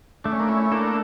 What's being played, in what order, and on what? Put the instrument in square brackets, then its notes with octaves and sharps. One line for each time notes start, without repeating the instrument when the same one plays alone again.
[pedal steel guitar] A3 [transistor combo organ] D4
[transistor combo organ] C#4
A#3 D4
C#4 E4
[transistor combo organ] A#3 D4 [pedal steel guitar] A4